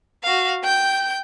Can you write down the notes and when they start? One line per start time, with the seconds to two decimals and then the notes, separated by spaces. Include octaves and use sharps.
0.23 F#4 F5
0.63 G5 G6